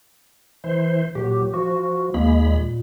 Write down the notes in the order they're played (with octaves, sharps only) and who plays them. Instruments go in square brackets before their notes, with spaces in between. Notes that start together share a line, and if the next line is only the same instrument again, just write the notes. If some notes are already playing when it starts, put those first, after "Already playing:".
[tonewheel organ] E3 C5
[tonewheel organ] A#2 F#3 [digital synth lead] G4
[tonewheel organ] F3 [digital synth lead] F#4
[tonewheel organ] D#2 G#3 B5 [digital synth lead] A#3
[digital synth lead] A#2